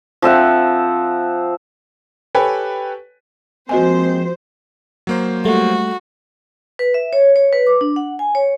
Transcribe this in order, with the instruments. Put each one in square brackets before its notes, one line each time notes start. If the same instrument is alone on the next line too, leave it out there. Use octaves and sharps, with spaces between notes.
[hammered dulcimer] F3 C4 E5 F#5
[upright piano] G4 A4 B4 C#5 G5 G#5
[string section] F3 C5 [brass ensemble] G#3 A#3 C4 [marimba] F#4 D#5 G#5
[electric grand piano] F#3 A#3 C5
[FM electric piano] G3 A3 [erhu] F#4
[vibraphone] B4
E5
C#5
C#5
B4
D6
D4
F#5
G#5
C#5